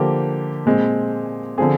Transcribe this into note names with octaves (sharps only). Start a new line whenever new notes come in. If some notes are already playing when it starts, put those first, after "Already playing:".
Already playing: D3 F3 A#3 G4
A#2 G#3 C4
D3 F3 C4 G#4